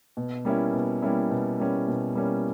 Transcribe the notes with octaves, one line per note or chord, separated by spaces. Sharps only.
B2
G3 A#3 C#4 E4
B2
G3 A#3 C#4 E4
B2
G3 A#3 C#4 E4
B2
G3 A#3 C#4 E4